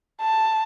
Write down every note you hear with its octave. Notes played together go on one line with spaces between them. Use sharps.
A5